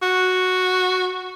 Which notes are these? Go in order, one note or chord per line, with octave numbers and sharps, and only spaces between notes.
F#4